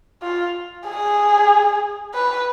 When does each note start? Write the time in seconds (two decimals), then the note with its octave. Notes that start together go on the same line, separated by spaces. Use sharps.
0.22 F4
0.87 G#4
2.14 B4